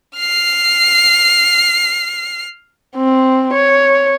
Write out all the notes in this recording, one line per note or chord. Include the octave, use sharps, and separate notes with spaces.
F6 C7
C4
C#5